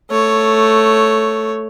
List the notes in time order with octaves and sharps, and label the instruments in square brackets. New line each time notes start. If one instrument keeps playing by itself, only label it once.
[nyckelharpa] A3 C#5